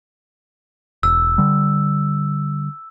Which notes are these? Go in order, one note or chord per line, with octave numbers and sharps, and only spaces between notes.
E1 E6
D3 G3